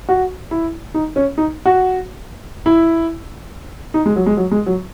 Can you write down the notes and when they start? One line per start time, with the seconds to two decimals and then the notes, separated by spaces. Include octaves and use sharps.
0.09 F#4
0.51 E4
0.94 D#4
1.16 C#4
1.38 D#4
1.66 F#4
2.66 E4
3.94 D#4
4.06 G#3
4.16 F#3
4.26 G#3
4.37 F#3
4.51 G#3
4.66 F#3